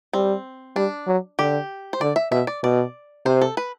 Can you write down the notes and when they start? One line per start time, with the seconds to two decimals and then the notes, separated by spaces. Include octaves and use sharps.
0.13 G3 C4
0.76 G3 D4
1.07 F#3
1.39 D3 G4
1.93 C5
2.01 D3 D5
2.16 E5
2.31 B2 E5
2.47 D5
2.63 B2 D5
3.25 C3 C5
3.41 A4
3.57 B4